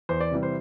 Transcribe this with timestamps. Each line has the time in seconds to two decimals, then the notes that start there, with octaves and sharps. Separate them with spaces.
0.09 E2 C5
0.20 D5
0.32 C3 E3 G3
0.43 C5